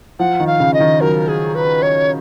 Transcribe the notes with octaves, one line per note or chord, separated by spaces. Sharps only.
F3 F#5
D#3
F5
C#3
D#5
D#3
F#3 A#4
G#4
B4
C#5